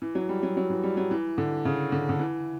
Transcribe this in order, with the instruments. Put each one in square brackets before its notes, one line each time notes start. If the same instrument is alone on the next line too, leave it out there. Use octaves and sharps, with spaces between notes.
[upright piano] E3
F#3
G3
F#3
F#3
E3
G3
F#3
E3
D3
C#3
D3
D3
E3